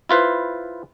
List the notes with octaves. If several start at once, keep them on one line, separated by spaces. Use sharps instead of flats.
E4 F4 B4 C5